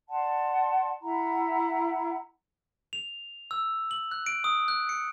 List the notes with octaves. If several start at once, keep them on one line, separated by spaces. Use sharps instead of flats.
D5 F#5 A5 C6
E4 F#5 A#5 B5
F7
E6
F#7
F#6
D7
D#6
F#6
C#7